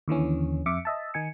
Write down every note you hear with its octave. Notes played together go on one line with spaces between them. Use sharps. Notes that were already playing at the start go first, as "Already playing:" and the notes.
D#2 D3 E3 C#4
F2 E5 D6 C#7
D#5 E5 A5
D#3 D#4 G#5 C#7